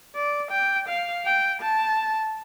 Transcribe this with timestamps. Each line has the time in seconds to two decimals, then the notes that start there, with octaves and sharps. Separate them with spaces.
0.15 D5
0.51 G5
0.88 F5
1.26 G5
1.62 A5